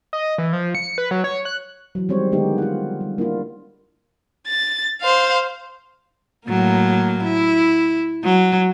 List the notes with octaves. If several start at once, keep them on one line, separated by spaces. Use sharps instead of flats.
D#5
E3
F3
C#7
B4
F#3
C#5
F#6
E3 F#3
D#3 G3 G#3 C4 C5 C#5
D3 D#3 G#3 B3 D#4 G4
F4 F#5
G3
A#3 D4 E4 F4
A6
C5 F5
A2 F#3 A#3
E4
F#3